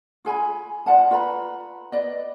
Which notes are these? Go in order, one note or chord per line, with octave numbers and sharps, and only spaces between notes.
F4 G#4 G#5 B5
F4 D5 F#5 A5
F4 B4 A#5 B5
B4 D5 D#5